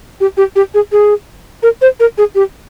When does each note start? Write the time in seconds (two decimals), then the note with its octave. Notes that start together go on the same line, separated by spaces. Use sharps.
0.20 G4
0.37 G4
0.56 G4
0.74 G#4
0.92 G#4
1.63 A#4
1.82 C5
2.00 A#4
2.18 G#4
2.35 G4